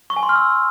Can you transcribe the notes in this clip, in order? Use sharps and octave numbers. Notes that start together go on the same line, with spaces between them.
C#6
G#5
C6
F6
E6